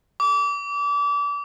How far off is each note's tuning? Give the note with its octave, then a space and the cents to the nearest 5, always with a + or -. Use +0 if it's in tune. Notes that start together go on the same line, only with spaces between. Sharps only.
D6 -30